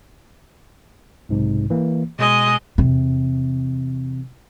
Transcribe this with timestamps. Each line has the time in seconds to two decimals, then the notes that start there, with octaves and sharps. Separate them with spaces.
1.29 B1 G#2 C3
1.70 E3 A#3
2.19 B2 G#3 D#5
2.78 E2 C3